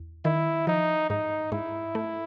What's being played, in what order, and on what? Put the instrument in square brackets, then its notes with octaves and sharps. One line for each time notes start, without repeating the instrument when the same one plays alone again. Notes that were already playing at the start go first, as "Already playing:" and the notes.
Already playing: [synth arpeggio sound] E2
[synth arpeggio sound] D#3 [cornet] E4
[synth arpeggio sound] F3 [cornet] D#4
[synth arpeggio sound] G#2 [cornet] D#4
[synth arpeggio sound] G#2 [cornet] E4
[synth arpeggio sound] A3